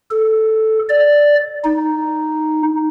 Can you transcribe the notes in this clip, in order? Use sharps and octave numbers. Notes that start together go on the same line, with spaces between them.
A4
D5
D#4